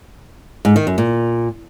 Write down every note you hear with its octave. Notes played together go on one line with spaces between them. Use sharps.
G#2
D#3
F#2
A#2